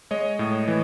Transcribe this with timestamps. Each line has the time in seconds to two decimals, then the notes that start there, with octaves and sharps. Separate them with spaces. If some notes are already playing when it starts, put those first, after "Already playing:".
0.11 G#3 C#5 D#5
0.39 A2
0.68 E3